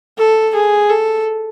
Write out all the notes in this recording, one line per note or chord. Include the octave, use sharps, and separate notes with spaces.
A4
G#4
A4